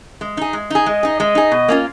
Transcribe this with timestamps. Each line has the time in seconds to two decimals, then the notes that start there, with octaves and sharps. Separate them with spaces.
0.21 G#3
0.37 D#4 G#4
0.53 G#3
0.70 D#4 G#4
0.86 G#3 D#5
1.03 D#4 G#4
1.20 G#3 D#5
1.35 D#4 G#4
1.51 B2
1.68 A#3 C#4 F4